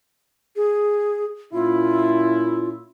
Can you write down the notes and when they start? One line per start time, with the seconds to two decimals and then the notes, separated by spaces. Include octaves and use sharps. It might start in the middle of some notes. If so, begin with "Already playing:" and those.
0.56 G#4
1.53 A#2 C#4 E4 F4